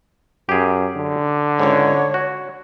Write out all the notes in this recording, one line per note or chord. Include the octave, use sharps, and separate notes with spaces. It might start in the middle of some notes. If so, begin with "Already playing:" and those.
F#2 G4 G#4
D3
C#2 G#2 C#5
F#4